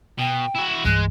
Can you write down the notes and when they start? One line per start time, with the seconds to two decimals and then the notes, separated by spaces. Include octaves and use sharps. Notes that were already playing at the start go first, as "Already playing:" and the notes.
0.19 B2 G5
0.56 E4 F#4
0.85 C2 G2 E3 G#3 F#6